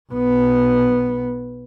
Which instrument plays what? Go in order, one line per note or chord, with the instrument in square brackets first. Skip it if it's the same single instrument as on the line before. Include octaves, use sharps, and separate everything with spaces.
[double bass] B1 B3